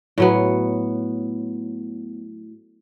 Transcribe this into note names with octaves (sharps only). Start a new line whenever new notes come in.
A2 F#3 B3